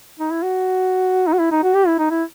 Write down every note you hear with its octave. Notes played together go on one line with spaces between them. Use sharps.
D#4
E4
F#4
D#4
F#4
E4
D#4
F#4
G4
E4
D#4
E4